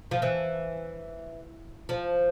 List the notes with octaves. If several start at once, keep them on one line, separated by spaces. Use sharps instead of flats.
F3
E3
F3